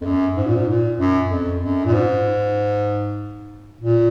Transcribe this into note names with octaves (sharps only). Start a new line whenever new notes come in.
F2
F#2
G#2
A#2
G#2
A#2
F#2
F2
F#2
A#2
G#2
A#2